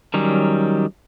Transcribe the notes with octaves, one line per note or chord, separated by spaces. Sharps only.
D#3 F#3 G3 C#4